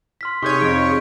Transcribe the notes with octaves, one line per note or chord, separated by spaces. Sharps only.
C6 F6 B6
C3 D#4 G#4 C#5 D#5 C#6 G6 G#6
F2 D7